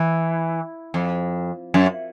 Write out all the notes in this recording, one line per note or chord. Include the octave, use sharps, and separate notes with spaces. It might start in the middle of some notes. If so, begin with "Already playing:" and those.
Already playing: E3
F2
F#2